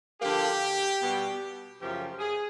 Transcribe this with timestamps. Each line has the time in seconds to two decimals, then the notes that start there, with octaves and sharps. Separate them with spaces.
0.21 D3 F3 A#3 G4
1.00 B2 G3 B3
1.80 F#2 C#3 F3 A3 G4
2.19 G#4